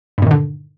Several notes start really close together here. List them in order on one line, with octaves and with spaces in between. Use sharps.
G2 A#2 D#3 D3